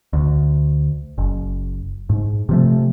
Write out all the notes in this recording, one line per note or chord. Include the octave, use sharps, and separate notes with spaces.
D2
F#1
G#2
C3 F3 A3